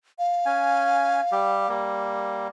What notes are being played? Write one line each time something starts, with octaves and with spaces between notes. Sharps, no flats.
F5
C#4 G#5
G3 G4
G3 A#3